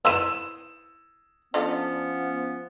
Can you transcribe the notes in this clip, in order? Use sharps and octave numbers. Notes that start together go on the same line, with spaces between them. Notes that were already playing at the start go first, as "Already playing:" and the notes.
E4 B4 C5 E6 E7
F3 B3 C#4 D4 F4 A4